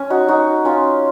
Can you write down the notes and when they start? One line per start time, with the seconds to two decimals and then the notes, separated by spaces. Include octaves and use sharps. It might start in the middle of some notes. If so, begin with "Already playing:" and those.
Already playing: C#4
0.10 D#4 F#4
0.28 D#4 F#4
0.65 C#4 F4